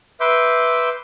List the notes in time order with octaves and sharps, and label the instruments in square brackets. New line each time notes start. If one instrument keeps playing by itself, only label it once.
[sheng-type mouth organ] B4 E5 C6 D6 G6